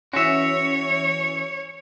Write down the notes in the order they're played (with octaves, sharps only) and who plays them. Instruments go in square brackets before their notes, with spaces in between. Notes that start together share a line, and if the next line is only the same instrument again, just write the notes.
[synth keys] E3 C#4 [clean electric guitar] F#4 E5 [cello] C#5